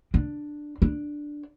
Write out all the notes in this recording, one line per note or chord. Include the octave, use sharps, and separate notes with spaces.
D4
D4